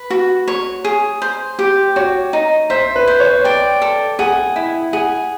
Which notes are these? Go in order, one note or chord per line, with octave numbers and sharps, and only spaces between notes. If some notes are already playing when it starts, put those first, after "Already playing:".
Already playing: B4
F#4
C#5
G#4
C5
G4
F#4 C#5
D#4
C5 E5
B4
C5
C#5
D5 G5
A4
G#4 F#5
E4
G#4 F#5